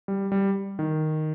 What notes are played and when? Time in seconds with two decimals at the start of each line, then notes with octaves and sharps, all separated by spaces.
0.08 G3
0.32 G3
0.79 D#3